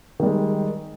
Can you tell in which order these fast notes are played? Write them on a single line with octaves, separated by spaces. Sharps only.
D#3 G3 G#3